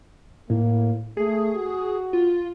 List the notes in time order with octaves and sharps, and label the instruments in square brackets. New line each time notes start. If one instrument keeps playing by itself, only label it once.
[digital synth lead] A2 [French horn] A#3
[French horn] A3 [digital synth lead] G#4
[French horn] F#4
[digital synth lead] F4